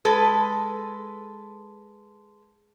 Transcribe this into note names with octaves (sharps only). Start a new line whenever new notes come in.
G#3 A4 B4